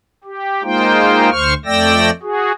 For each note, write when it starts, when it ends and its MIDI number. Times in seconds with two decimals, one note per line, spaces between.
0.24 0.63 67
0.63 1.30 56
0.63 1.30 58
0.63 1.30 63
0.63 1.30 65
0.63 1.30 72
0.63 1.30 79
1.31 1.54 38
1.31 1.54 72
1.31 1.54 85
1.31 1.54 89
1.65 2.10 41
1.65 2.10 57
1.65 2.10 74
1.65 2.10 79
1.65 2.10 88
1.65 2.10 94
2.22 2.52 66
2.22 2.52 68